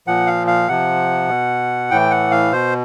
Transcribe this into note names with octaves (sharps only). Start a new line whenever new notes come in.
A#2 F3 F#5
F5
F5
C3 F3 F#5
B2
A2 E3 G5
F#5
F5
B2 C5